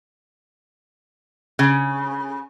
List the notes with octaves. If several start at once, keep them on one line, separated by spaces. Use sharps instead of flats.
C#3